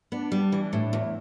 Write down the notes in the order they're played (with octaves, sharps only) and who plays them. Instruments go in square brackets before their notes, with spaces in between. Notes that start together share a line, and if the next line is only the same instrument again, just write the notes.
[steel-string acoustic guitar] B3 [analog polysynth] D4
[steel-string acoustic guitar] G3
E3
A2
[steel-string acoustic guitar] E2 [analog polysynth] E4